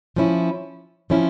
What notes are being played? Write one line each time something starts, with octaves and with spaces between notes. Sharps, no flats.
F3 C#4 E4
F3 C#4 E4